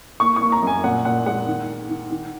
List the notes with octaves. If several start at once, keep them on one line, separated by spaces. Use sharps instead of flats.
A#3 C#6
C#6
A#3
A#5
F#2
G#5
A#2 F#5
A#2 F#5
G#3 F#5
D#3
D#3
D#3
D#3